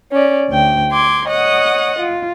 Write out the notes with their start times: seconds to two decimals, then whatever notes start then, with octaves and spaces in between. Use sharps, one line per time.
0.11 C#4 D5
0.50 D2 G5
0.92 C6 D6 G#6
1.28 C#5 D#5 F#5 D#6
1.99 F4